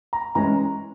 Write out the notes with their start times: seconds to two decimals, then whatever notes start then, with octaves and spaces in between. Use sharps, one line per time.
0.13 A#5
0.35 E3 G#3 C#4 A#5